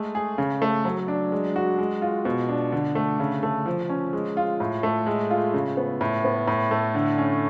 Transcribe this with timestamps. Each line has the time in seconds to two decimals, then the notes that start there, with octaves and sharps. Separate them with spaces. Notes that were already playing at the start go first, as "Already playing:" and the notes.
Already playing: G#3 A3
0.15 G#4
0.38 C#3
0.62 A3
0.85 F#3
1.08 D4
1.32 G#3
1.56 F#4
1.78 G#3
2.02 F4
2.25 B2
2.49 D4
2.72 D3
2.95 A3
3.20 C#3
3.43 A3
3.66 F3
3.89 C#4
4.13 G#3
4.37 F4
4.60 A2
4.83 A3
5.06 G#3
5.31 F4
5.54 C#3
5.77 B3
6.01 A2
6.24 B3
6.47 A2
6.71 A3
6.95 D3
7.18 C#4